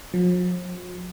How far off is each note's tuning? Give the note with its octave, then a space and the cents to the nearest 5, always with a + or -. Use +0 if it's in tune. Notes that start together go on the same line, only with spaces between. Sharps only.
F3 +45